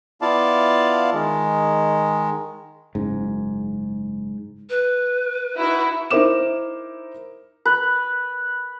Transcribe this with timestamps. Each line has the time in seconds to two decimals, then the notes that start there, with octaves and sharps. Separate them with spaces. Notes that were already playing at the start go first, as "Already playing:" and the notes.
0.21 B3 E4 F4 D5 F5 A5
1.13 D#3 G#3
2.95 F#1 G#2
4.69 B4
5.58 D#4 E4 F#4
6.10 D#4 E4 A#4 C5 D6 E7
7.65 B4